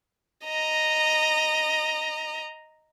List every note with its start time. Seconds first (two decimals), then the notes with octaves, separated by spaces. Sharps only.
0.45 D#5 A#5